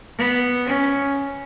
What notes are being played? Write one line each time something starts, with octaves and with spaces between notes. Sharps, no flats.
B3
C#4